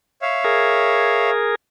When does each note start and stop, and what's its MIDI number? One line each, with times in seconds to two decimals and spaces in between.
0.22 1.30 73
0.22 1.30 76
0.22 1.30 77
0.44 1.55 68
0.44 1.55 70